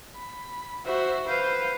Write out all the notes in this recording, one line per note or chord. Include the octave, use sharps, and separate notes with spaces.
B5
F#4 C5 E5
B4 C5 F5